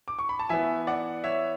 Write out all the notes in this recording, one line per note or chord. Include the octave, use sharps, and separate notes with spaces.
D6
C#6
B5
A5
E3 B3 E5 G#5
D5 F#5
C#5 E5